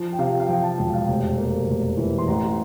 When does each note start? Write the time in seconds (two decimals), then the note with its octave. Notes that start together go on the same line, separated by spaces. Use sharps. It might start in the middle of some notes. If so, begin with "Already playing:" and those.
Already playing: F3
0.13 G5
0.19 C3 F5
0.40 F5
0.48 F3 G5
0.63 A5
0.78 E1 G5
0.94 F5
1.08 F1
1.38 A#3
1.68 F1
1.97 E3
2.18 C6
2.28 A1 A#5